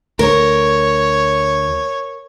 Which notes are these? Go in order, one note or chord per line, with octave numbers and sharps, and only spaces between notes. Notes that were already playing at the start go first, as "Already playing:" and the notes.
D2 A#4 C#5